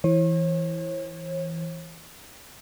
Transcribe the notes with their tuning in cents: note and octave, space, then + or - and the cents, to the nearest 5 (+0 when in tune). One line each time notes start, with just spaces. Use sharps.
E3 +0 C#5 -40